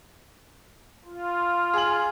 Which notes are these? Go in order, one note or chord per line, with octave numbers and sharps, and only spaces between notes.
F4
G#4 F#7